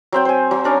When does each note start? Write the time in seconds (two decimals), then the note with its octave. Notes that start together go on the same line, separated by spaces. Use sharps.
0.12 F#3 C4 G5
0.25 C5 G#5
0.51 F#3
0.64 C#4 D4 A#4